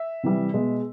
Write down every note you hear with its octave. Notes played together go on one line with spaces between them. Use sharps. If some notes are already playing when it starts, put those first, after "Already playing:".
Already playing: E5
C3 E3 G3
B2 G#3